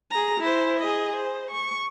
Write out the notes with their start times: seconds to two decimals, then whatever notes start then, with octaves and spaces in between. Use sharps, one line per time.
0.11 G#4 A#5
0.40 E4 C5
0.80 G#4 D#5
1.16 C5
1.50 C#6